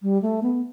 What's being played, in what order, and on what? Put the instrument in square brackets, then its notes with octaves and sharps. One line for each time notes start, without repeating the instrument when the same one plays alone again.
[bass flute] G3
A3
B3